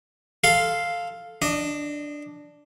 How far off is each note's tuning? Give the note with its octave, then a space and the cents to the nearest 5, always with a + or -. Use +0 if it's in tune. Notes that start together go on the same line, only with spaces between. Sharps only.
A4 +0 F5 +0 C6 +0
D4 +0 D#5 -20